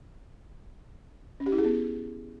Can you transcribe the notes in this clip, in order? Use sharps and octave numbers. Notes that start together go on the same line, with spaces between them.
C#4
G4
E4
G#4
B3